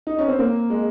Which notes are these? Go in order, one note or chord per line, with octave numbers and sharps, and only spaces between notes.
D#4
C#4
C4
A#3
G#3